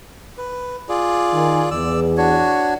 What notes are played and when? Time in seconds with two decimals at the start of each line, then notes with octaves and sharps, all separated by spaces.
0.38 B4
0.89 F4 G#4 D5
1.32 D#3 A#4 G#5
1.71 E2 D5 E6
2.17 D4 F#4 C#5